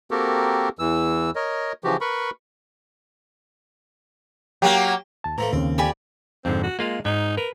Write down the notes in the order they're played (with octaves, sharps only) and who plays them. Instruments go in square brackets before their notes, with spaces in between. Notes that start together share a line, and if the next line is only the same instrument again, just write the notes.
[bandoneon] A#3 C4 F#4 G4 A4 A#4
E2 E3 E6
A#4 C#5 D#5
C#3 E3 F3 F#4 G4
A#4 B4 B5 C#6
[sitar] F#3 A#3 [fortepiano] G4
[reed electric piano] D#2 A5
[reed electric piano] A2 A#5 [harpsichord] E3 F3 A3
[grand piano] D#2 [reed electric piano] C#3 C#4 [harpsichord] C4
[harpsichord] F2 D5 [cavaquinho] G4 G#5 B5
[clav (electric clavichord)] F2 G#2 D3 [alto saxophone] C4
[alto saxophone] F#4
[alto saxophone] G#3 [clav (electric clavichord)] A#3 F4 F5
[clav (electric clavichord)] G#2 [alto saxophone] D#4
[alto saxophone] A#4 [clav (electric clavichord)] B4